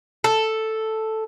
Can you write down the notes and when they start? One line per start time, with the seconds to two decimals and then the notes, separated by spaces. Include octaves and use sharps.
0.24 A4